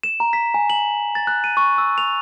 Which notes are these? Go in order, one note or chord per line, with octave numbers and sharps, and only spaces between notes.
E7
A#5
B6
G#5
F#7
A6
F#6
D#7
C#6
E6
F7